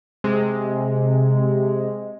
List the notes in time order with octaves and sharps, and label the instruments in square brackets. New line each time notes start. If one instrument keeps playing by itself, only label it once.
[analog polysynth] C3 G#3